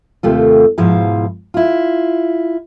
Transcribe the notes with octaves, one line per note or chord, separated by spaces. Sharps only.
D#2 C3 A3 F4
G#2 B2 F3 E4 F5
E4 F4